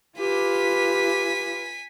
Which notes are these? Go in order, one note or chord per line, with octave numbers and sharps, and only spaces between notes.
F4 G4 B4 G#5 B6